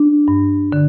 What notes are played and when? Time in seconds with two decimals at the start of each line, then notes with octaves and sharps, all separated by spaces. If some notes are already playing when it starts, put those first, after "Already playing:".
Already playing: D4
0.28 G2
0.72 D3